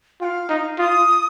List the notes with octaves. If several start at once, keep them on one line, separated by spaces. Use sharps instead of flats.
F4 G5
F5
D#4
F4 D#6